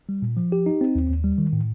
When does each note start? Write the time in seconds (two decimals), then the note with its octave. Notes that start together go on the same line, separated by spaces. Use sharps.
0.09 G3
0.22 A#2
0.37 F3
0.52 G4
0.66 D#4
0.81 C4
0.95 D#2
1.10 D#2
1.24 G3
1.38 D#3
1.53 A2